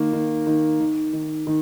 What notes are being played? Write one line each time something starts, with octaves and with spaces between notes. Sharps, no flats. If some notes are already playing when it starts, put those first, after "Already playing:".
Already playing: D#3 A#3
D#3
D#3
D#3
D#3
D#3